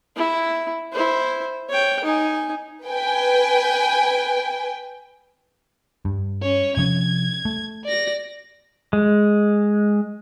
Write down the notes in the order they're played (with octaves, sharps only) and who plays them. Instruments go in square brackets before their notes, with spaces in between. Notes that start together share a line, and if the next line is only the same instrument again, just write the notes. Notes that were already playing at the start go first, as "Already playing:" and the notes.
[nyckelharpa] E4
E4 C5
C#5 G5
D#4 G#5
[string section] B4 G5 G#5
[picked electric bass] G2
[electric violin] C#4 C#5
[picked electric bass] C3 F3 C#4 [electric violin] G#6
[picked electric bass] A3
[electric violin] D5 A#6
[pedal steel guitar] G#3